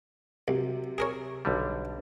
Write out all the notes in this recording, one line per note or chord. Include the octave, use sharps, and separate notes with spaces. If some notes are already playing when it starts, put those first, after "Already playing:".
C2 C3 F#3
G#4 A#4 C#5
B1 D3 G3